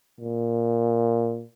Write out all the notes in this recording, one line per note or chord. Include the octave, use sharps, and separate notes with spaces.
A#2